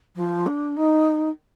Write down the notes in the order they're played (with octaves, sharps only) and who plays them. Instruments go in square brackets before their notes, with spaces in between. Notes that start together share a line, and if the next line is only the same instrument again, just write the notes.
[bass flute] F3
D4
D#4